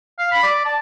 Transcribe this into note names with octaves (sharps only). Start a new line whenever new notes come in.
F5
B5
D5
A5